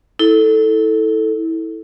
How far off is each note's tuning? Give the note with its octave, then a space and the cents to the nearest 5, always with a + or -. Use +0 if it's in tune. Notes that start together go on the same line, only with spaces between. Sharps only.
E4 -25 A4 +0